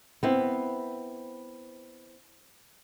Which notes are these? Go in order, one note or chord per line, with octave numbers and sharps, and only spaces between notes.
B3 C4 E4